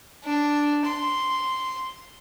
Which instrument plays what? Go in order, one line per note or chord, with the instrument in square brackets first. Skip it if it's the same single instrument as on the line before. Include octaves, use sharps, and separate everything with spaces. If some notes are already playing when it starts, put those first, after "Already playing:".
[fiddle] D4
C6